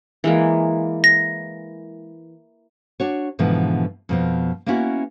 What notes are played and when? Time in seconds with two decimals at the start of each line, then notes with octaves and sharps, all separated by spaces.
0.24 E3 G#3 A#3
1.04 A#6
3.00 D4 F#4 C#5
3.39 G#2 B2 D3 E3 F3
4.09 F2 B2 F3
4.66 A#3 B3 C#4 E4 F#4